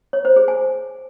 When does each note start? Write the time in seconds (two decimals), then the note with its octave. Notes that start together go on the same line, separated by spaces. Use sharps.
0.13 C#5
0.25 C5
0.36 G#4
0.48 G#5